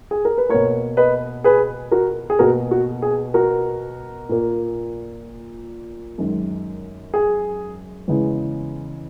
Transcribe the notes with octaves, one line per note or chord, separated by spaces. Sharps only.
G#4
A#4
B4
B2 A#3 A#4 C#5
B4 D#5
G#4 B4
F#4 A#4
G#4
B2 A#3 F#4 A#4
F#4
G#4
F#4 A#4
A#2 A#3
F#2 D#3 G#3
G#4
E2 C#3 E3 G#3